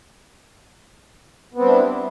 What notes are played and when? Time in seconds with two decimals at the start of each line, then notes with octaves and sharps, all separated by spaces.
1.54 B3
1.57 C4
1.61 G3
1.64 D4
1.68 E4